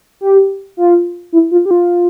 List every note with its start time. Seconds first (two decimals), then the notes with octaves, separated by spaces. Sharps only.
0.21 G4
0.77 F4
1.33 E4
1.51 F4
1.66 G4
1.71 F4